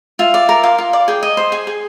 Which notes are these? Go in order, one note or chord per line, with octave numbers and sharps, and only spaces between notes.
F4 E5
D5
A#4
F4 F5
F4
D5
G#4 G5
D#5
C5
G#4 G#5
G#4